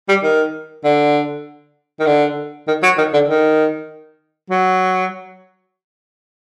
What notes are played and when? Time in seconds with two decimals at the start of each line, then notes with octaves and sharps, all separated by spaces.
0.09 G3
0.23 D#3
0.84 D3
2.00 D#3
2.07 D3
2.68 D#3
2.83 F#3
2.98 D#3
3.14 D3
3.29 D#3
4.50 F#3